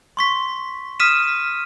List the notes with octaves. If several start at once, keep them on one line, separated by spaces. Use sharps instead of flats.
C6 C#6 B6
D#6 F6 B6 D#7 E7